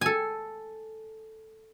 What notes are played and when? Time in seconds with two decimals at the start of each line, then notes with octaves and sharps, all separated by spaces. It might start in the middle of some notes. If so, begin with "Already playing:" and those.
0.01 A4 G#5